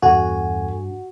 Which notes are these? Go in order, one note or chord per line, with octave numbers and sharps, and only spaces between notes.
E2 G2 F#4 A4 G#5